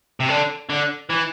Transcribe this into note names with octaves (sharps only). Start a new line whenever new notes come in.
C3
D3
D3
E3